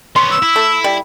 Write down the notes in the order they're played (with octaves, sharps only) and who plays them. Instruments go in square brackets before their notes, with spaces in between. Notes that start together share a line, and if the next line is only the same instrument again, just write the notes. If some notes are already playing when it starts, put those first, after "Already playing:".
[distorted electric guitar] B3 C#4 [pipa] C6
[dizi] E6
[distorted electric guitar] E4
[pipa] A3
G3